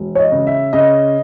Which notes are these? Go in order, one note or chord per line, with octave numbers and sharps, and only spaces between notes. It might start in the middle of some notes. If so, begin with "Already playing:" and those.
Already playing: E1
C#5
D#5
C#3
E5
C#3 D#5